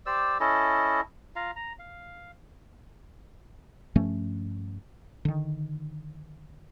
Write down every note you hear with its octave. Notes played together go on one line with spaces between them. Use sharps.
G4 C5 D5 E6
C#4 E4 A4 D#5
F4 F5 A#5
A#5
F5
G2 F3 A3 C#4
D3 D#3